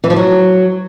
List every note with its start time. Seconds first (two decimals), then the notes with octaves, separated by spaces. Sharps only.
0.04 E3
0.10 F3
0.16 F#3